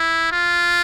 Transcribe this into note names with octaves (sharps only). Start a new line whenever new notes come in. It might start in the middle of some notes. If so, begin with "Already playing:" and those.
Already playing: E4
F4